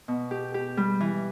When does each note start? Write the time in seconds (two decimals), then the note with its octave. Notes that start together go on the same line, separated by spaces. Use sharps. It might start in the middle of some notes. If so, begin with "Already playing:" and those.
0.08 B2
0.31 G4
0.54 G4
0.77 G3
1.00 E3